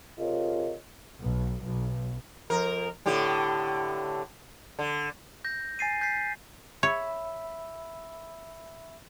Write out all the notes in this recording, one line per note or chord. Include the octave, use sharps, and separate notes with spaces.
C3 F4 G#4 A#4 C#5 D#5
B1
B1
F2 A#4
A2 D3 G4
D3
G6 A#6
G#5 A6 C7 D#7
G6 A6 B6 C7
C#5 E5 B5 E6